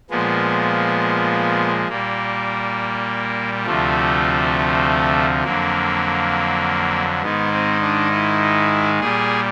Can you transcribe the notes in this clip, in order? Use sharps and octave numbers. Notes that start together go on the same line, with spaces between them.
A#2 F3 G#3 B3
A#2 G3 A#3
D2 C3 F3 A3
F2 D3 F#3 A#3
G#2 D#3 G#3 B3
C4
D4
E4
A#2 G3 G#4